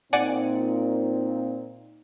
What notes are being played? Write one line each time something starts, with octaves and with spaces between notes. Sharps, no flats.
A#2 C4 D#4 D5 F#5 G#5